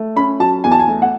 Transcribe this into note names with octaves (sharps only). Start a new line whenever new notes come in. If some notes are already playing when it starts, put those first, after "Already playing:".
Already playing: A3
C#4 B5
F#3 A5
E2 G#5
A5
G#5
A3
F#5